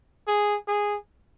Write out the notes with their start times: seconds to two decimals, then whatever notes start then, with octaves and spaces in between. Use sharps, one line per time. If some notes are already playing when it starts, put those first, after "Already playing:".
0.28 G#4
0.68 G#4